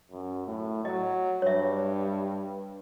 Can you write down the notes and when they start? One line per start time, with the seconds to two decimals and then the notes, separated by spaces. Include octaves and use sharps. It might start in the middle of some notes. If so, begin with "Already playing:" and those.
0.11 F#2
0.47 A2
0.85 F#3 D#5
1.42 G2 C#5 E5